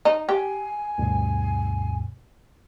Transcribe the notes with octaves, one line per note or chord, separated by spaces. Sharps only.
D#4
G4 G#5
D2 G2 B2